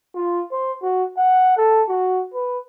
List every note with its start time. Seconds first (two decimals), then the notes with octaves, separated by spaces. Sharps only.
0.15 F4
0.52 C5
0.82 F#4
1.17 F#5
1.57 A4
1.88 F#4
2.34 B4